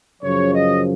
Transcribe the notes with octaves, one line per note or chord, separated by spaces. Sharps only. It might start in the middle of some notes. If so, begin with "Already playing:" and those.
F#2 C#3 F3 C#5
D#5